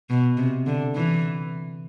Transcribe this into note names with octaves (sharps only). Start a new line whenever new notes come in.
B2
C3
D3
E3